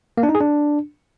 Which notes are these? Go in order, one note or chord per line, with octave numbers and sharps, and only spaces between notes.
A#3
D4
D#4
G#4
D4